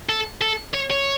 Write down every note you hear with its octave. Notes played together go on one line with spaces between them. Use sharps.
A4
A4
C#5
C#5